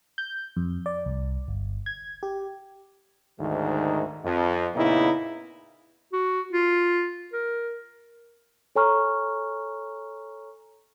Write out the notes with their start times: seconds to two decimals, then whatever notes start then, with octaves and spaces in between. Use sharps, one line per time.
0.18 G6
0.57 F2
0.86 D5
1.06 C2
1.48 G1
1.86 G#6
2.23 G4
3.39 D2 G#2 D#3
4.24 F2
4.75 A#2 C#3 B3 D#4 E4
6.13 F#4
6.52 F4
7.33 A#4
8.76 A4 C#5 G#5 A#5 C#6 F6